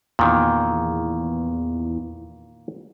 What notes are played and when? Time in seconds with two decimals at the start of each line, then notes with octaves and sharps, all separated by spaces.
0.19 E2 A#2 D#3